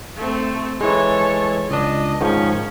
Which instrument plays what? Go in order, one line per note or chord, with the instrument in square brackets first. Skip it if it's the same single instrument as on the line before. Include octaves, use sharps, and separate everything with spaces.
[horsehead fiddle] A3 C4
[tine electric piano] E3 G#3 [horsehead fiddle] A4 C#5
[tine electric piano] C#2 D4 [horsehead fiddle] D#5
[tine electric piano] G#2 D#3 F3 [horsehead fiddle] C#4